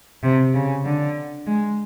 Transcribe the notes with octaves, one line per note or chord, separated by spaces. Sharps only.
C3
C#3
D3
G#3